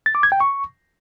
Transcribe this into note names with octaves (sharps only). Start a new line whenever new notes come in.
A6
D6
G#6
G5
C#6